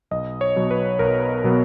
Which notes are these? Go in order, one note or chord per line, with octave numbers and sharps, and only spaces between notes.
B1 D#5
C#5
B2 F#3 B3
B4
B1 A#4
B2 F#3 B3